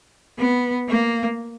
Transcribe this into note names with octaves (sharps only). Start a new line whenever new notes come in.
B3
A#3